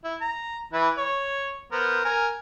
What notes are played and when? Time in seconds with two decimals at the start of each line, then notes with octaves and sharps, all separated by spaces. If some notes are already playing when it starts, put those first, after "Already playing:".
0.04 E4
0.21 A#5
0.73 E3 E4 B4
0.97 C#5
1.72 B3 A#4 C5
2.05 A#4 G#5